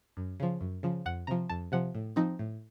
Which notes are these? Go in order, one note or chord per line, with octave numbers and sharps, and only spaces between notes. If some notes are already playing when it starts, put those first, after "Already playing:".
F#2
C#3 F3
F#2
C#3 F3
F2 F#5
C3 F3 A#5
F2 A5
C3 F3 F#5
A2
F3 C4 D#4
A2